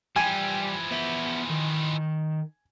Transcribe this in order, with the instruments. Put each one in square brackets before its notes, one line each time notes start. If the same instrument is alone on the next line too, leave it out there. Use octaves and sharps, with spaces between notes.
[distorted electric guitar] E3 F3 [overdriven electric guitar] G3 G5 [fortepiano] G#5
[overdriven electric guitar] B3 E5
D#3